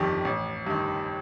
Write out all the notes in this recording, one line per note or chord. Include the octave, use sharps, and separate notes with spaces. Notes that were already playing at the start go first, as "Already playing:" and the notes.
Already playing: G1 F2 D#3 G3
A1
G2 D#3